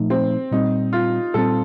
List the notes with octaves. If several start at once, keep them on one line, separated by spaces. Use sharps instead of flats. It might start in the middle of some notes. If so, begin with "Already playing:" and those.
Already playing: A#2 F3 A3 D#4
C4
A#2 G3 C4 D#4
F4
A#2 G3 C4 A4